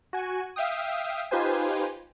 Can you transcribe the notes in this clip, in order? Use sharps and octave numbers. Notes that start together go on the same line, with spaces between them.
F#4 G#5
E5 F5 G5 D#6
D#4 F4 G4 B4 C5 G#5